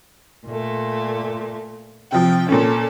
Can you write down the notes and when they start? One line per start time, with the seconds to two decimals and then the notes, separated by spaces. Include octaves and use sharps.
0.46 A#2 A3
2.12 C3 F3 G5
2.49 A#2 C#4 A4